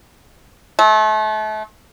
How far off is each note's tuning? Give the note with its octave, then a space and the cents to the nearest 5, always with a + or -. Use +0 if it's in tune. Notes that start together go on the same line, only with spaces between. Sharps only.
A3 -35